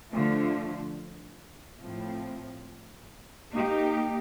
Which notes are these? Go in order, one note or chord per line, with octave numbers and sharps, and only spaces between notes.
D3 F3 A3
A2 F3 C4
A#3 D#4 G4